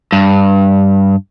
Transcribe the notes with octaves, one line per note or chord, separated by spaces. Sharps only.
G2